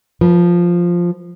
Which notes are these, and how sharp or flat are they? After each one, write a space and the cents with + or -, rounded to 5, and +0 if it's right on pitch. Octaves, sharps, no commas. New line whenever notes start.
F3 +0 B4 -30